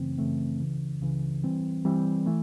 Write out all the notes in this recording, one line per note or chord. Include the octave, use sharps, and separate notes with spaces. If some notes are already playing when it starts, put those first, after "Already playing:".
Already playing: F#2 C#3 E3 A3 C4
F#2 C#3 E3 A3 C4
C#2 C#3 E3
C#2 C#3 E3
E3 G3 C4
E3 G3 C4
E3 A3